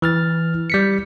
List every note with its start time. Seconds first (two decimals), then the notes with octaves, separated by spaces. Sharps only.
0.02 E3 F6 A6
0.70 G3 B6 C#7